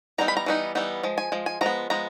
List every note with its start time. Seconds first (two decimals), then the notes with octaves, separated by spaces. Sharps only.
0.18 E3 G3 B3 D#4 A#5
0.28 B5
0.37 A#5
0.46 E3 G3 B3 D#4
0.75 E3 G3 B3 D#4
1.03 F3 G#3
1.18 G#5
1.32 F3 G#3
1.46 G#5
1.61 F3 G#3 B3 A#5
1.90 F3 G#3 B3 A#5